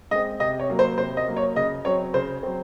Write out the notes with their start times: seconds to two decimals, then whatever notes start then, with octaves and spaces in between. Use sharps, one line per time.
0.11 G#3 D#5
0.15 C4
0.40 C3 D#5
0.59 C#5
0.70 F#3 A#3
0.79 C5
0.98 C3 C5
1.17 D#5
1.28 F#3 A#3
1.36 C#5
1.56 C#3 D#5
1.85 F#3 C4 C#5
2.14 C#3 C5
2.43 F#3 C4